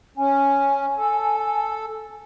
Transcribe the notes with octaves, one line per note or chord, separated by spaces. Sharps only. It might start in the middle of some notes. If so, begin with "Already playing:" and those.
C#4 G#5
A4